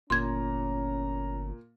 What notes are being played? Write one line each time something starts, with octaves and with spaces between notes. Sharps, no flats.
G1 A#2 C#4 A#5 C6 G#6